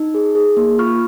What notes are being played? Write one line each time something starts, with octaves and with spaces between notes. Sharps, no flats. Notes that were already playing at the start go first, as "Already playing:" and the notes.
Already playing: D#4
G#4
G#4
A#3
F4 C#6 F6